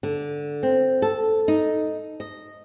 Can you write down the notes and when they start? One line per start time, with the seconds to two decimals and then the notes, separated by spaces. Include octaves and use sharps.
0.03 D3
0.63 C4
1.02 A4
1.48 D#4
2.20 D#5